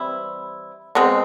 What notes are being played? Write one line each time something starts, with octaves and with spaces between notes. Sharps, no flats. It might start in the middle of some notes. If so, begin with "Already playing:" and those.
Already playing: E3 G3 C4 E4
B2 G#3 C4